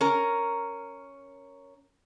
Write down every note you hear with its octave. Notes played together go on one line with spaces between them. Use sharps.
C#4 A#4